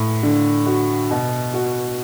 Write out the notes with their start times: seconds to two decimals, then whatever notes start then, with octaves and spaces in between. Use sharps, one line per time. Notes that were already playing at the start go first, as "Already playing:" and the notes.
Already playing: A2
0.23 D3
0.66 F#4
1.11 B2
1.54 F#4